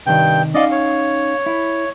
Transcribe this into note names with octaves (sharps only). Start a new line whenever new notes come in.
G2 C3 D#3 G5
C#4 D#4 D5 D#5 F5
C#5
E4